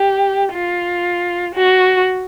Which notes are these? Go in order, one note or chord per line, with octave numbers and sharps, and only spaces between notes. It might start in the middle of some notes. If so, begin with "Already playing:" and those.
Already playing: G4
F4
F#4